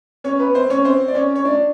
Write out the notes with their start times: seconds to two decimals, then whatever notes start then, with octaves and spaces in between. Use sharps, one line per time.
0.24 C#4 C#5
0.39 B3 B4
0.54 C4 C5
0.70 C#4 C#5
0.84 C4 C5
1.08 D5
1.14 C#4 C#5
1.35 C#5
1.45 D4 D5